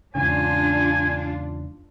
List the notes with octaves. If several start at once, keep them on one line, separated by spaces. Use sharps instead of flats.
E2 G#2 C#3 D4 F4 G#5